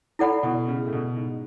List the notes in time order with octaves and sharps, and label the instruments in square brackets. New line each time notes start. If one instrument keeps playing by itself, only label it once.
[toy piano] E4 A4 D5 F#5 B5
[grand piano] B2
C#3
A2
B2
G#2